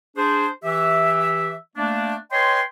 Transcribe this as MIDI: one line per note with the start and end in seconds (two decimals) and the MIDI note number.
0.16 0.47 62
0.16 0.47 68
0.16 0.47 72
0.63 1.53 52
0.63 1.53 67
0.63 1.53 76
1.76 2.14 57
1.76 2.14 58
1.76 2.14 62
2.32 2.60 71
2.32 2.60 73
2.32 2.60 75
2.32 2.60 79
2.32 2.60 80
2.32 2.60 84